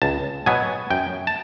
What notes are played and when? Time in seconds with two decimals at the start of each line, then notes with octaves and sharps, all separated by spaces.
0.02 C#2 A5
0.46 B2 F#3 B3 G#5
0.90 F#2 G5
1.27 A5